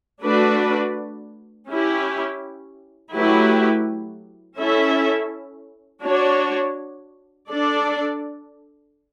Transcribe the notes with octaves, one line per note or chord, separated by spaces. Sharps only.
A3 D4 F#4 B4 D5
C#4 E4 G4
F#3 A3 E4 G4 B4
C#4 E4 A4 E5
D4 F#4 C#5
D4 A4 D5